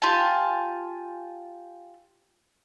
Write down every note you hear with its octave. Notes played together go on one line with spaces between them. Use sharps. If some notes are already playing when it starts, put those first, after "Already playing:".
F4 G4 G#5 A5